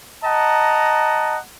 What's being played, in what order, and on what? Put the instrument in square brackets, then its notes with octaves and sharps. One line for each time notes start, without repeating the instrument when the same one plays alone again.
[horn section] D#5 F#5 A5 A#5